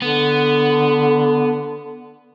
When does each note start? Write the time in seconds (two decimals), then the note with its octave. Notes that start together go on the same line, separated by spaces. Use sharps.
0.02 D3 B3